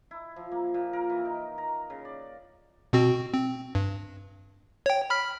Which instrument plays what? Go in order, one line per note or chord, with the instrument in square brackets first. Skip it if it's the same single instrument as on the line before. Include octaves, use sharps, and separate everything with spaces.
[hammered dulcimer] E4
F3
A#3
A#2
A#4
E3
D#4
A#5
C#3
D5
[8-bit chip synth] B2 C4 F#4
C4
G2
C#5 G5
B5 F6 B6